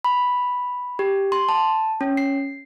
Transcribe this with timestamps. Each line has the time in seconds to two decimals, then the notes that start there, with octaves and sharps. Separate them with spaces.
0.04 B5
0.99 G4
1.32 C6
1.49 A5
2.01 C#4
2.17 C7